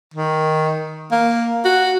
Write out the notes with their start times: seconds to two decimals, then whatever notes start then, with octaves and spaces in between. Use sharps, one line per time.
0.14 D#3
1.12 A#3
1.65 F#4